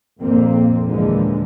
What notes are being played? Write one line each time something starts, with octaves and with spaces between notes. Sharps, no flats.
A#1 F2 A#2 A#3 C4
D#2 A#2 D3 E3 F3 G#3